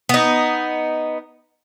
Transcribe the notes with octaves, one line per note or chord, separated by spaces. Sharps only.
B3 D#4